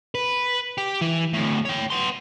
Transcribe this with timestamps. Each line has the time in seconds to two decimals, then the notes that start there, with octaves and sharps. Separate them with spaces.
0.15 B4
0.78 G4
1.01 E3
1.33 D2 A2
1.65 C#5 G5
1.91 B3 C6